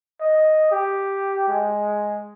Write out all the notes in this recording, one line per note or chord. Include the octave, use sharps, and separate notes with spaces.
D#5
G4
G#3